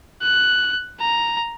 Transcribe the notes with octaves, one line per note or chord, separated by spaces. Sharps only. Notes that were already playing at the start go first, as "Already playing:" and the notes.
F#6
A#5